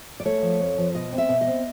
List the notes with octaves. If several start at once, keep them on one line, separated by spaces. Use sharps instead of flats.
D5
A3 C#5
F3
F2
F3
B2 D#5
C4
E5
B2
D#5
C4